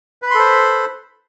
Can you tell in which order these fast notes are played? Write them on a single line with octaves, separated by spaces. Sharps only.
B4 B5 C6 A4 C5